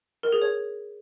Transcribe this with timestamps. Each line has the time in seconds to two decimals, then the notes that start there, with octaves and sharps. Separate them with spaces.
0.23 A#4
0.32 G#4
0.42 C#5